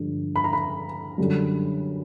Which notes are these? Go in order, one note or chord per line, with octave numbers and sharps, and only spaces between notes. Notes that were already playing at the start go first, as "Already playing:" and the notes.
Already playing: G2 D3 F3 G#3
B5
A#5
B5
F#2 D3 G3